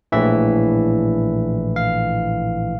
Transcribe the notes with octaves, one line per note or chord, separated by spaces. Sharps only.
A#1 A2 E3 E5
F5